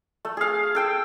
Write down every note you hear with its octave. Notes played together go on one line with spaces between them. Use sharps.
A3
G#4 F5
A4 G5 E6